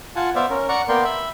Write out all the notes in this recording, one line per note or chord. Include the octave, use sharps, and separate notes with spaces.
F4 F#5 G#5 A5
B3 C5 D5 E5 F5
C#4 A#4
D5 F#5 A#5 C#6
A#3 B3 A#4 D5 G5 C6
E5 B5